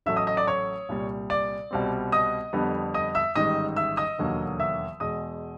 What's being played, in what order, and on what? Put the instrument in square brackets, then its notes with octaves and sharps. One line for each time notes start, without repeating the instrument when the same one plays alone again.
[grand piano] A1 A2 F#3 A3 E5 E6
D#5 D#6
D#5 D#6
D5 D6
C#5 C#6
C2 A#2 G3
D5 D6
C2 B2 G3 C4
D#5 D#6
F2 D3 G3 B3
D#5 D#6
E5 E6
A1 G#2 D#3 G3 D#5 D#6
E5 E6
D#5 D#6
E1 D#2 D3 F#3 A#3
E5 E6
E2 B2 G#3 D#5 D#6